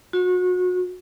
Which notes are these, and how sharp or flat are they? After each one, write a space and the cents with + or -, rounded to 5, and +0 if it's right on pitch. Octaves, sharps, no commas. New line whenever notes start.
F#4 -30